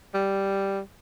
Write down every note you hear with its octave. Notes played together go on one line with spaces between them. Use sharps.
G3